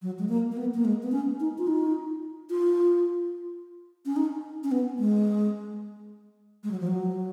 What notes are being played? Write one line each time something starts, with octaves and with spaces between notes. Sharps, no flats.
F#3
G#3
A#3
A#3
B3
A#3
G#3
B3
C#4
D#4
F4
D#4
F4
C#4
D#4
C#4
B3
G#3
G#3
F#3
F3
F#3